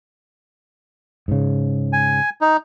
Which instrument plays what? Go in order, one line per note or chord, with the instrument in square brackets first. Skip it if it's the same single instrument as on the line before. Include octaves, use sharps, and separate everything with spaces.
[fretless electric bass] G#2 C#3
[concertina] G#5
D#4